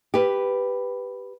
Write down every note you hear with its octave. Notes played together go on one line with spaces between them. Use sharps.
G4 B4